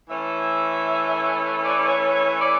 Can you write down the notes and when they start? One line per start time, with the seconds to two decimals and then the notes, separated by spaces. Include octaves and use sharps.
0.10 E3 A3 C#4 E5
1.64 D5
1.89 C#5
2.15 C#5
2.41 D5